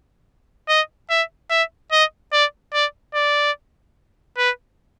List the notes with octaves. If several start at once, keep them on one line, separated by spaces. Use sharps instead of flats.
D#5
E5
E5
D#5
D5
D5
D5
B4